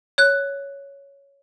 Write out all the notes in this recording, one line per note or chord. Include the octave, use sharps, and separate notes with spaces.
C#5 F#6